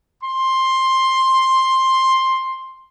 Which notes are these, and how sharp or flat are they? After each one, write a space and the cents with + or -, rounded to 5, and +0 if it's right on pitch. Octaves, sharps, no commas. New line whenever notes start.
C6 +10